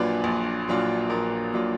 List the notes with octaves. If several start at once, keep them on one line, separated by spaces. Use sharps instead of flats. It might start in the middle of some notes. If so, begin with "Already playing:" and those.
Already playing: A#1 A#2 F#3 D4 F4 B4 D5 G#5
A#1
A#2 F#3 D4 F4
A#1 A#4
A#2 F#3 D4 F4